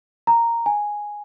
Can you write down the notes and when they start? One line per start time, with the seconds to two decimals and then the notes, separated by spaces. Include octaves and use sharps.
0.27 A#5
0.66 G#5